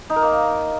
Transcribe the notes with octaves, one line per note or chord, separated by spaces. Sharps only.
D#4
A#4
A#3